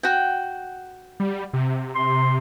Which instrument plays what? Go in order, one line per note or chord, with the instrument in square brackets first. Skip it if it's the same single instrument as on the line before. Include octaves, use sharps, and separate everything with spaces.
[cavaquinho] F#4 F#5 G5
[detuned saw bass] G3
C3
[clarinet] C6